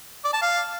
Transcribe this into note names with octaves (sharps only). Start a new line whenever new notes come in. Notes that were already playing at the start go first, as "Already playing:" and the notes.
D5
A5
F5